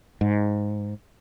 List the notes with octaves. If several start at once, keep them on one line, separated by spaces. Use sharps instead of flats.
G#2